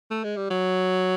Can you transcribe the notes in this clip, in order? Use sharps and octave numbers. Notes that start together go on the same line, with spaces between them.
A3
G#3
G3
F#3